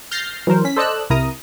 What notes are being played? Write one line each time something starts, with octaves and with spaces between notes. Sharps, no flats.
F6 G6 A6 A#6 C7
E3 F#3 A#4 C5
C#4 B6
A4 C5 D5 D#5 E6 F#6
C2 C3 E4 A#4 A#5 D#6